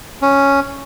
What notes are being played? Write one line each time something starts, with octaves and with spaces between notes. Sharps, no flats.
C#4